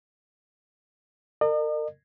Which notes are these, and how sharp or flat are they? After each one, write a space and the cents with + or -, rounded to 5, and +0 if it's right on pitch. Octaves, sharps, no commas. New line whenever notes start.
A#4 -35 D#5 -45